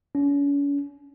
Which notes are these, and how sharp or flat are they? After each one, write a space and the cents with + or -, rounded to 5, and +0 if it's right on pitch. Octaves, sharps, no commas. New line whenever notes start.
C#4 +40